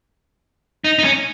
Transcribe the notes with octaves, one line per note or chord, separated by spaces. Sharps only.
D#4
D#4
C#4